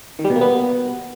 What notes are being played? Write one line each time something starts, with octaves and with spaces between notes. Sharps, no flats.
D#3
G3
B2
A#3
B3